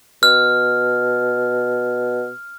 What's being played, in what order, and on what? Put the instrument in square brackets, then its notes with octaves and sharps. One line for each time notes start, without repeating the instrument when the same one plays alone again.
[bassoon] B2 [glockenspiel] F6